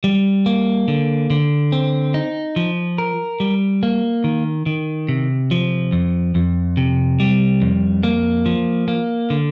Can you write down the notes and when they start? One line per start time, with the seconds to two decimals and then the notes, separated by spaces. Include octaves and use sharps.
0.04 G3
0.46 A#3
0.88 D3
1.30 D3
1.72 C4
2.14 D#4
2.56 F3
2.98 A#4
3.40 G3
3.83 A#3
4.24 D#3
4.66 D#3
5.09 C3
5.51 F3
5.92 F2
6.35 F2
6.77 C3
7.20 G3
7.62 F2
8.03 A#3
8.46 F3
8.88 A#3
9.30 D3